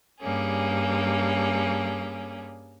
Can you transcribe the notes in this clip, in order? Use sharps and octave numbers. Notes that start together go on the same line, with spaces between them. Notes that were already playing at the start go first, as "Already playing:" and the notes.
G2 G3 A#3 C#4 G#4